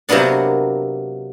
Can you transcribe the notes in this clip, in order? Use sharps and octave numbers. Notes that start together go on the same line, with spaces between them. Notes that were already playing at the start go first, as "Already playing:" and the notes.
C3 F#3 A#3 B3 D4